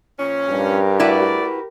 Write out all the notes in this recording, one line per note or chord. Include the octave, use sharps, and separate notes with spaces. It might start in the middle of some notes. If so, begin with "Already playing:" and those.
A#2 F3 C#4
G2 G4 A#4
A3 E4 F#4 B4 D5